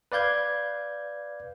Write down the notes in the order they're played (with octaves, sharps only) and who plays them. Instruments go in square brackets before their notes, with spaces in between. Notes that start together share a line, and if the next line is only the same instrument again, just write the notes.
[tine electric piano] B4 D5 F5 G6 G#6